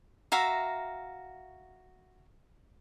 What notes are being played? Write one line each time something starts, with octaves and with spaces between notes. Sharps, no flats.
F#4 E5 F5 A#5